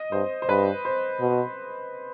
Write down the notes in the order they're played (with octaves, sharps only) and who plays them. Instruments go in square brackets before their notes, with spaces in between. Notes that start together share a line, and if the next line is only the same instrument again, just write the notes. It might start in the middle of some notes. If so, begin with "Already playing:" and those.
Already playing: [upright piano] D#5
[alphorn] G2 [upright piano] C5
[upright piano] C5
[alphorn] G2 [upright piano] B4
[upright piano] C5
[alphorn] B2